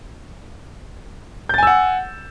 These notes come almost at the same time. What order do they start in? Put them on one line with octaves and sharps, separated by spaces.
G6 A6 G#5 E6 F#5